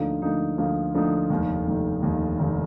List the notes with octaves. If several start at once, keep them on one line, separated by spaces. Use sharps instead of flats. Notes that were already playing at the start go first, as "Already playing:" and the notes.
Already playing: D2 D3 F3 A#3 D#4
D2 D3 F3 A#3 D#4
D2 D3 F3 A#3 D#4
D2 D3 F3 A#3 D#4
F1 D#2 D#3
F1 D#2 D#3
F1 D#2 D#3
F1 D#2 D#3